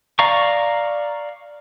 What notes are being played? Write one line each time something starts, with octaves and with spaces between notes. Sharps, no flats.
D5 F5 A#5 C#6